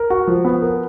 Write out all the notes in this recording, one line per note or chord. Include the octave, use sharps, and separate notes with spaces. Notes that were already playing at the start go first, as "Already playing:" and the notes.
Already playing: A#4
F#4
F3
B3
A#4